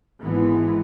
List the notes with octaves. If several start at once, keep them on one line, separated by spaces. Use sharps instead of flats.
G#1 G#2 E3 G#3 B3